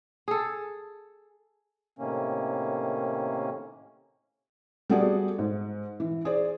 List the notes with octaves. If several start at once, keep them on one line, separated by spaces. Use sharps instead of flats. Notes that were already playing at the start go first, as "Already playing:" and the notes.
G#4 A4
A2 C3 D#3 A#3 C#4
G3 A3 B3 F#4 G#4 D5
G#2
E3
G#4 C5 D5